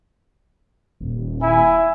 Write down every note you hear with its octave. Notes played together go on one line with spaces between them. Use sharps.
D#1
E4 G#5